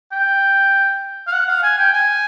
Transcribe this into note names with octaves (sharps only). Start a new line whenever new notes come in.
G5
F5
F#5
F5
G#5
G5
G#5